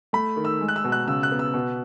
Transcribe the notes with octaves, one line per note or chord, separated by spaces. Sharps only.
A3 B5
D#3
E6
G#3
F#6
E6
B2
F#6
C#3 E6
F#6
B3
E6
B2